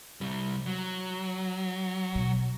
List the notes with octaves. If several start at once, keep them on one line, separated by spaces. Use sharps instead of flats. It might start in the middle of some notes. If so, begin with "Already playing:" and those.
C2 G3
F#3
B2